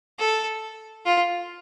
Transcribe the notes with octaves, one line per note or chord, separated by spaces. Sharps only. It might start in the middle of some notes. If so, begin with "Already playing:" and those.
A4
F4